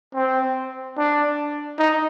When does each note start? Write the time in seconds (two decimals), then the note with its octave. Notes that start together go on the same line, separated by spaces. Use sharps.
0.15 C4
0.97 D4
1.79 D#4